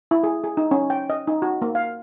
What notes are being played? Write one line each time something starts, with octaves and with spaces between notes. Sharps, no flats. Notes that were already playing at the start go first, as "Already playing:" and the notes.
E4
G#4
G#4
D#4
C#4
G5
D#5
D#4
F#4
A#3
F5